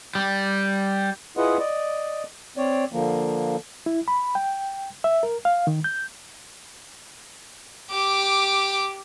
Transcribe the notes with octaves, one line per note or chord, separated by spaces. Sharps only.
G3
E4 F4 G#4 B4 D#5 F#5
D5 D#5
C4 C#5 D5
D3 F3 A#3
E4
B5
G5
E5
A#4
F5
D#3
G6
G4 D6